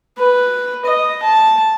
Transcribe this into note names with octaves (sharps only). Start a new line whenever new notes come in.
B4
D#5
A5